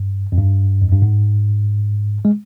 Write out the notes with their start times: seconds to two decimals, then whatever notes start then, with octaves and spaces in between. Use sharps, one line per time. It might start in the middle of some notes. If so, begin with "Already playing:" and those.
Already playing: G2
0.32 F2
0.38 G2
0.82 F2
0.92 G2
1.02 G#2
2.25 G#3